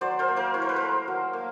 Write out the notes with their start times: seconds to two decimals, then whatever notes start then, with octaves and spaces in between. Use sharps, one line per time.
0.01 F#3 C5 D5
0.19 A#4 C5
0.28 A#3
0.37 A#4 C5
0.54 E4 C#5
0.62 C5
0.69 B4
0.76 A3 A#4 C5
1.08 F#3
1.33 A#3